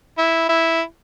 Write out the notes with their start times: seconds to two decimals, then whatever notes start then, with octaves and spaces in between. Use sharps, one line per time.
0.18 E4
0.49 E4